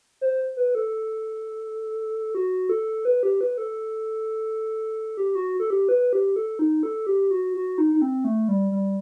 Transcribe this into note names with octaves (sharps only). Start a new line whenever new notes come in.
C5
B4
A4
F#4
A4
B4
G4
B4
A4
G4
F#4
A4
G4
B4
G4
A4
D#4
A4
G4
F#4
F#4
D#4
D#4
C4
A3
G3
G3